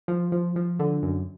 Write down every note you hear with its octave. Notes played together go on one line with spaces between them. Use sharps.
F3
F3
F3
D3
F#2